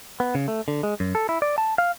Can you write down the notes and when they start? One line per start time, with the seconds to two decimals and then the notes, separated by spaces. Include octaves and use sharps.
0.20 B3
0.35 C#3
0.48 A3
0.68 D3
0.83 G#3
1.00 F#2
1.15 A4
1.29 E4
1.42 D5
1.58 A5
1.78 F5